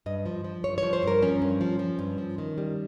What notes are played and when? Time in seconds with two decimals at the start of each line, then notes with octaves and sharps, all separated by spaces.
0.06 G2 D#5
0.26 F3
0.44 F3
0.64 G2 C#5
0.78 F3 C#5
0.93 C5
1.03 G2 A#4
1.22 F3 C#4
1.42 G2
1.61 F3
1.79 F3
1.99 G2
2.18 F3
2.38 D#3
2.58 G3